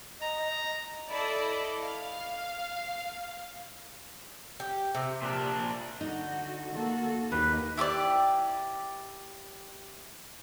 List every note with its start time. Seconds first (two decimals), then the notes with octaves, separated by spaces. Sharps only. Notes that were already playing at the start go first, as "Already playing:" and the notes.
0.21 D#5 A#5
1.08 E4 A4 D5 D#5
1.82 F5
4.60 G4
4.95 C3
5.22 A#2 D4
6.01 D3 D#4 F#4
6.73 A#3 F#4 A4
7.32 D#2 D#4 B4
7.77 E4 G4 C5 D5